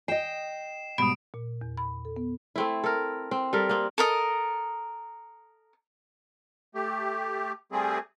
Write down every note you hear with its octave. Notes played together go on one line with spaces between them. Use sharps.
D#5 G5 C7 E7
G#2 B2 G3 B5 D#6 D7
A#2
E2
B5
A4
B3
A3 C4 E4
A4 A#4
C4
G3 A4 A#4
A#3 C4
A4 A#4 D#5
A3 G4
G3 A3 C4 G#4